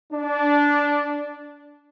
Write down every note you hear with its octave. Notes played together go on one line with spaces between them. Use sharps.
D4